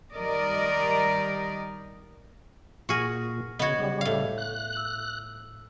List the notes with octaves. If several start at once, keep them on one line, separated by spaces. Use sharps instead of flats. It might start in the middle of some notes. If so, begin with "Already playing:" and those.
D#3 G3 A#4 D5 D#5
A#2 F#4 G#4 C#6 F6 A#6
C#3 B3 F#4 D#5 G#6
C#3 G3
A2 F5
F#6
E6 F#7